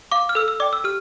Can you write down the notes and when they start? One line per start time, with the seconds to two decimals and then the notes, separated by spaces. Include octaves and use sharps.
0.12 F5 D6
0.29 F6
0.35 A4 E6
0.48 E6
0.60 D5 G5 D6
0.73 E6
0.84 G4 F6